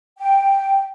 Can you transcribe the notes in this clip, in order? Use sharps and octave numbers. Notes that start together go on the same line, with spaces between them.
G5